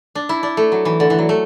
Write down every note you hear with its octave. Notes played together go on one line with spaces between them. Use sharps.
D4
E4
D4
A3
F#3
E3
D3
E3
F#3
A3